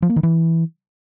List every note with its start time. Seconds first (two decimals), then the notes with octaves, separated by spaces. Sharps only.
0.02 F3
0.09 A#3
0.16 D#3
0.23 E3